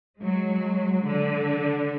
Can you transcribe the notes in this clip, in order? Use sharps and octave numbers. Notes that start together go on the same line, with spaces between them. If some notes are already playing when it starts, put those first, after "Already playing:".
F#3 G#3
D3